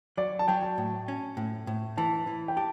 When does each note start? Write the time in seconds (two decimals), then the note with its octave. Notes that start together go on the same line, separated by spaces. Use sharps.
0.18 F#3 D5
0.39 A5
0.48 F#3 G5
0.63 A5
0.78 A2
1.08 C#4
1.37 A2
1.67 A2
1.97 E3 A5
2.27 E3
2.48 G5
2.56 G4 A5